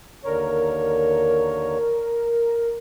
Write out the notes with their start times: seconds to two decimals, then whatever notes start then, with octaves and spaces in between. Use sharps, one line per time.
0.25 D#2 D3 A#4 C#5